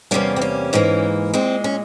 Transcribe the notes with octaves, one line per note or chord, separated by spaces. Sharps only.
E2 C3 G3 A#3 C#4
C4
C#4
G#2 E3 A#3
A#2 G#3 C4
C#4